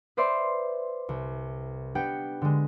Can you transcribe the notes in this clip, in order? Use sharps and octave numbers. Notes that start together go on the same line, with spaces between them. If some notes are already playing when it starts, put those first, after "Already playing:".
B4 C5 D5 E5 C6
C2
B3 D4 G4 F#5 G5 C#7
D3 G#3